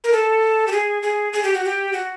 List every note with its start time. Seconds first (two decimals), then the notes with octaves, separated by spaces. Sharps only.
0.04 A#4
0.12 A4
0.67 G4
0.72 G#4
1.03 G#4
1.33 G#4
1.43 G4
1.54 F#4
1.64 G4
1.93 F#4